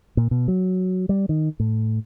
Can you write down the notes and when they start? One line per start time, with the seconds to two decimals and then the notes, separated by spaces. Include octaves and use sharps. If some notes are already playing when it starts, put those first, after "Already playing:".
0.17 A#2
0.31 B2
0.48 F#3
1.09 G3
1.29 D#3
1.60 A2